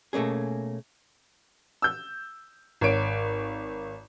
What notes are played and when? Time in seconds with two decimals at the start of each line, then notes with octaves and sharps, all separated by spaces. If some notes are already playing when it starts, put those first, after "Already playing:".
0.13 B2 A3 A#3 C#4 G#4
1.82 E6 G6
2.81 G#1 C#5 D7